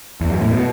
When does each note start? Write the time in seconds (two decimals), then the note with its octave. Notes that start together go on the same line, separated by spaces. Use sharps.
0.21 E2
0.30 F#2
0.41 A2
0.51 B2